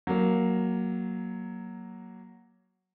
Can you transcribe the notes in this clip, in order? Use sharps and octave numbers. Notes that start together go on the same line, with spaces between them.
F#3 A#3